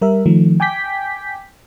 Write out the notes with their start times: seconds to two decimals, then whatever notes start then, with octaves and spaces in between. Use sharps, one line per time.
0.02 G3 A#4 E5
0.26 D#3 F3 A3
0.60 G5 G#5 D6 G6 B6